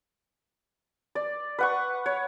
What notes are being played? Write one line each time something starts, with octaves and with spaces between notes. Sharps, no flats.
D5
B4 F#5 C#6
C#5